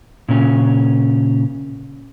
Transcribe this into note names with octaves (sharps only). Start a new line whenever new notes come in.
A#2 C#3 C#4